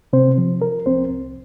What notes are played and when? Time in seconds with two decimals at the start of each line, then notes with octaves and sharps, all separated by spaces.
0.13 C3 C4 C5
0.38 F3
0.62 F3 A#4
0.86 C2 C4 C5
1.11 C2